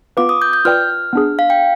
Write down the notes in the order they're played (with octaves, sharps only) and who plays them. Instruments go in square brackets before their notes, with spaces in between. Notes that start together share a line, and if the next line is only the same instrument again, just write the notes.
[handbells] B3 F4 B4 F5 [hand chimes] D6
[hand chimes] D#6
G6
G6
[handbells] F4 B4 D5 G5 [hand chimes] F6
[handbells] B3 D4 G#4
[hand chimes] F5
G5